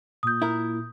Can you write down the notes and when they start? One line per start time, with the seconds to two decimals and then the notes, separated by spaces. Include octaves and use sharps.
0.23 A#2 D#6 G6
0.42 E4 A#4